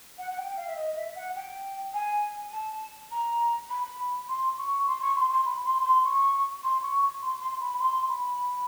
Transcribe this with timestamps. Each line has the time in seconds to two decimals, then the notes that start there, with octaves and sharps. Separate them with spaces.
0.18 F#5
0.31 F#5
0.38 G5
0.57 F5
0.67 E5
0.76 D#5
0.96 E5
1.15 F#5
1.36 G5
1.94 G#5
2.52 A5
3.11 A#5
3.70 B5
4.28 C6
4.58 C#6
4.87 C6
5.01 C#6
5.16 C6
5.31 C6
5.46 B5
5.65 C6
5.84 C6
6.04 C#6
6.63 C6
6.83 C#6
7.02 C#6
7.22 C6
7.41 C6
7.60 B5
7.80 C6
8.09 B5